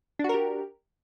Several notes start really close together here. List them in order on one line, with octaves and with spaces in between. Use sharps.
D4 F#4 A#4 G4